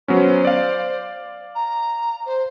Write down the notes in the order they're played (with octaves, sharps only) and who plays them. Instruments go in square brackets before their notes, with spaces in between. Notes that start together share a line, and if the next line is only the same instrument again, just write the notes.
[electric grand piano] F#3 B3 C#4 [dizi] C5
[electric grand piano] D5 F5
[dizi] A#5
C5